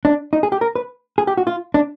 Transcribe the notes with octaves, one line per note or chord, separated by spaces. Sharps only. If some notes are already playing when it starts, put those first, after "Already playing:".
D4
D#4
G#4
G4
A#4
B4
G#4
G4
F#4
F4
D4